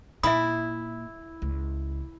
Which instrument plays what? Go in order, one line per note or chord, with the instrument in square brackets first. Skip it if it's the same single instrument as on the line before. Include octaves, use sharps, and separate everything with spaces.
[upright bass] A#2 [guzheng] E4 [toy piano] E5 G#5 D#6
[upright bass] C#2